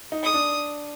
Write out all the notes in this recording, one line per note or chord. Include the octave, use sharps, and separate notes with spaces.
D#4
D#6
D4